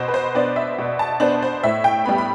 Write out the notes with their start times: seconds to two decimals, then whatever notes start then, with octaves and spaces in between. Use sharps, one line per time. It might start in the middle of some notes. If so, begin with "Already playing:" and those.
Already playing: B2 C5
0.08 B4
0.14 C5
0.35 B3 D4 D5
0.56 E5
0.78 B2
0.99 A5
1.20 B3 D4 C5
1.42 C5
1.63 A2 E5
1.84 G5
2.06 G3 B3 B5
2.18 B5